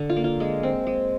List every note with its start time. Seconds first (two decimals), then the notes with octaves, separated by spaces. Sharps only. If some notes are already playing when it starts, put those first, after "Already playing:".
Already playing: D3
0.10 F4
0.16 A#3
0.24 F4
0.40 G#3
0.63 C4
0.87 G#3